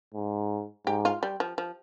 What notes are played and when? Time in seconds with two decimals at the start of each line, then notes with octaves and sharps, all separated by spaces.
0.14 G#2
0.86 G#2 G4
1.05 F4
1.23 G3
1.40 F3
1.58 F3